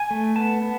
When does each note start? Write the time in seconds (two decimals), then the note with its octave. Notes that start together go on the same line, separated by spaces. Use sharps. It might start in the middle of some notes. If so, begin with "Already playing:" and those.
Already playing: G#5
0.11 A3
0.36 B3 A5
0.62 B3